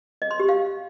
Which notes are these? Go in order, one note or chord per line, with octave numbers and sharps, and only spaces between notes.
D#5
C6
G4
F5